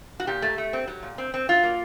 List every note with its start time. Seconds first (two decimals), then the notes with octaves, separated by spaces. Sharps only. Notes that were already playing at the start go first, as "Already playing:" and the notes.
0.20 F#4
0.27 A#2 G4
0.42 A3
0.58 A3
0.73 C4
0.87 F#3
1.03 A#2
1.18 C4
1.34 C4
1.49 F#3 F4
1.63 A#3